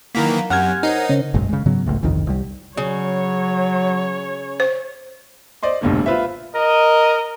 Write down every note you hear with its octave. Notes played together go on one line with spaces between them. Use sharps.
D#3 E3 F#3 A#3 F5 A#5
F#2 C4 G4 F#5 G#5 F6 G#6
D#4 A#4 C5 C#5
C#3 C#4
F#1 B1 G#2
C#3 G#3
G#2 C#3 F#3 B3
G#1 C#2 A2
G1 C2 F2 D#3
C2 G3
C#3 F#3 C#5
C5
C5 D5 D#5 C6
F1 B1 G2 A#2 D3
F4 B4 C5 E5
A#4 D#5